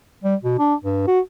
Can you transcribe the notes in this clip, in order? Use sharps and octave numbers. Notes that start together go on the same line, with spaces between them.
G3
B2
D4
G2
F#4